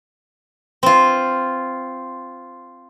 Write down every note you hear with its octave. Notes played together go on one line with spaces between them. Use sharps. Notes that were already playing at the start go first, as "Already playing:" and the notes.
C4 F4